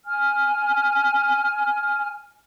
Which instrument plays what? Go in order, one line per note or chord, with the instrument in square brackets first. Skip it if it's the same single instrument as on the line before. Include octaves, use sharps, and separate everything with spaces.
[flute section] G#5 F6